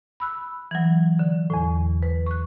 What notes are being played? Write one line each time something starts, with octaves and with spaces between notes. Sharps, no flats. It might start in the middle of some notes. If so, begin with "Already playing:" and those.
B5 E6 F#6
E3 F#3
D3
E2 A2
B4
C#6 F#6